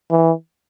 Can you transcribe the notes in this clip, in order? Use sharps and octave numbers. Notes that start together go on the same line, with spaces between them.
E3